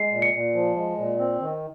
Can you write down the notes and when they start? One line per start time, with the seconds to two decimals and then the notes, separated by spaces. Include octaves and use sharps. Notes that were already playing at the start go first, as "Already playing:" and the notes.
Already playing: G#3 C7
0.12 A#2
0.22 C#7
0.33 A#2
0.55 F3
0.76 G#3
0.98 A#2
1.19 C4
1.40 D#3